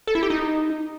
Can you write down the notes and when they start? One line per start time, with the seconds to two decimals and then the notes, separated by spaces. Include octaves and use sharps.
0.07 A4
0.15 E4
0.23 G4
0.30 D#4